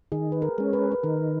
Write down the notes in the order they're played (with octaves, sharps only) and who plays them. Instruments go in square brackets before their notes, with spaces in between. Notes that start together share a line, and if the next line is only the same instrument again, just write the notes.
[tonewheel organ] D#3 [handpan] G#4
[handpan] B4
A#4
[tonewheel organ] G#3 C#4
[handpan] B4
B4
[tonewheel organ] D#3 [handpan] A#4